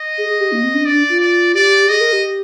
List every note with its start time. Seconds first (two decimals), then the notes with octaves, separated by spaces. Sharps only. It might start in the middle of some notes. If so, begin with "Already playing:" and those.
Already playing: D#5
0.18 G#4
0.28 G#4
0.41 G4
0.52 A#3
0.63 C4
0.75 D4
0.86 D4 D5
1.10 F4
1.21 D5
1.55 G4 D5
1.89 G#4 D#5
2.01 A#4
2.12 G4